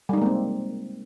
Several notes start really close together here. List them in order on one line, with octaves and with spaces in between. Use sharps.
G3 D#4 G#3 A#3 C4